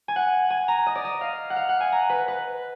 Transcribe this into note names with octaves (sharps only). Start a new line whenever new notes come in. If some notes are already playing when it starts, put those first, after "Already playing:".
G#5
F#5
G#5
A#5
D#5
D5
D#5
F5
F#5
F5
F#5
G#5
A#5
B4
B4